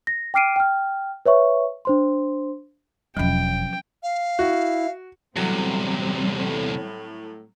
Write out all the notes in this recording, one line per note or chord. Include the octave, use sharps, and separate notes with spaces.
A#6
G5 D6 F6 C7 D7 D#7
G5 F6
B4 C#5 E5 C#6
D4 C5 C6
E1 F3 F#3 C#4 F4 G5
F5
E4 F#4
E2 A2 C3 F#3 G3 C4